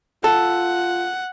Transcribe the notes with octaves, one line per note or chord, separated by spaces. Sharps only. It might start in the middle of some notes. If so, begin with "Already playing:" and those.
F4 A4 F#5